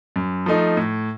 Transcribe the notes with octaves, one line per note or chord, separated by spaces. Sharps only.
F#2
F3 A3 D#4
A2